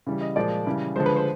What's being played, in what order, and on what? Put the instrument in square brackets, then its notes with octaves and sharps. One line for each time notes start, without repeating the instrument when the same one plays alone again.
[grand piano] C#3 E3 G3
D#5
A#2 F3 G#3 D5
C#3 E3 G3
D3 F3 G#3 C5
B4
C5